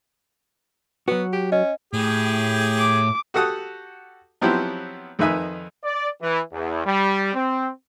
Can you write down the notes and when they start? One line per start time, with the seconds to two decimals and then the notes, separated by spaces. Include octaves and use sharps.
1.08 F#3 B3 F#4
1.33 G4
1.52 C#4 D#5
1.93 A2 G4 G#4
2.79 D6
3.34 F#4 G4 A4 F#5 D#6
4.41 F3 F#3 B3 C4 E4 G4
5.19 F2 D#3 D#4 B4 E5 G#5
5.84 D5
6.22 E3
6.53 E2
6.86 G3
7.34 C4